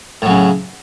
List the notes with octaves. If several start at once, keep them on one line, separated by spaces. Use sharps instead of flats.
A2 C#3 F#3